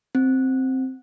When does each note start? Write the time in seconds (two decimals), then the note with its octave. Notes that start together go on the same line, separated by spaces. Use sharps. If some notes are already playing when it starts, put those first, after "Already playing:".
0.15 C4